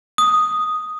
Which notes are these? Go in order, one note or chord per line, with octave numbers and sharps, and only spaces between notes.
D#6